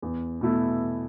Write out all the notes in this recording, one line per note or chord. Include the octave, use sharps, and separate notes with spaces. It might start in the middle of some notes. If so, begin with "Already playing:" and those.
E2
B2 A3 E4